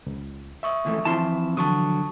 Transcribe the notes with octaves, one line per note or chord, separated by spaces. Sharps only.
C#2
E5 C#6 D#6
C#2 E3 A3
E3 F3 C4 E4 A5 C6
D3 F#3 A5 C#6 D#6